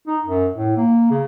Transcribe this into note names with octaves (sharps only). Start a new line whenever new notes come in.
D#4
F#2
A2
A#3
C#3